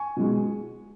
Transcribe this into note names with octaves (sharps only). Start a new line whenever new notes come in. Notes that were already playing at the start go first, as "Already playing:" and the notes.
Already playing: G#5 C#6
B2 G#3